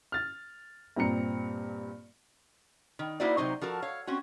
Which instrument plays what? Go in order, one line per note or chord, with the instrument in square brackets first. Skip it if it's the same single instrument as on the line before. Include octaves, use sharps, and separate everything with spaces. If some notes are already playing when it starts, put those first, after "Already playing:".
[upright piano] F6 A6
G2 A#2 C4 A#5 C#7
[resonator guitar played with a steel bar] D#3
A#3 D#4 E4 F#4 C5 D5
C3 F#3 D#4 C5
F3 F#4 A4 A#4
C#5 F5
C4 C#4 F#4